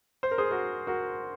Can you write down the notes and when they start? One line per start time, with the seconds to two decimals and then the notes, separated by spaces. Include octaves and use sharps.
0.23 C5
0.31 A#4
0.38 G#4 C5
0.51 F#4 A#4
0.87 F#4 A#4